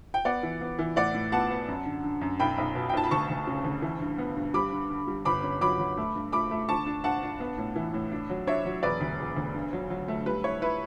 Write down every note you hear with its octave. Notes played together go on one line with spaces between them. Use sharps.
G5
B3 D5 F#5
E3
B3
E3
A2 D5 F#5
A2
B3 F#5 A5
B3
F#2
D3
D3
F#2
B1 G5 B5
B1
B2
G5
B1 A5
B5
D2 A5 C#6
D2
C#3
D2
E3
G2
B3
G2
G3 B5 D6
D3
D3
G3
G1 B5 D6
C#4
F#3 B5 D6
F#3
A3
G2
A3 B5 D6
A3
D3 A5 C#6
D4
G2 F#5 A5
D4
B3
A2
E3
A2
D4
F#3
D4 C#5 E5
F#3
E1 B4 D5
D2
E1
D2
G2
F#3
F#3
A3
G3 B4
E4 C#5
E4 B4